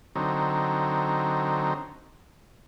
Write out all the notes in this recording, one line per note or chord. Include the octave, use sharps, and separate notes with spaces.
D3 F#3 C4 D#4